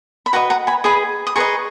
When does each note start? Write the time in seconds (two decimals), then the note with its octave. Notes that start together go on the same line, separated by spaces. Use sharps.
0.26 B5
0.33 F#4 B4 D#5 F#5 A#5
0.50 F#5 A#5
0.67 G#5 B5
0.84 G#4 B4 D#5 B5 D#6
1.27 D#6
1.36 G#4 B4 D#5 A#5 C#6